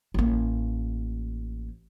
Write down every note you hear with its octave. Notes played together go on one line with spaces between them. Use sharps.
A1 A#3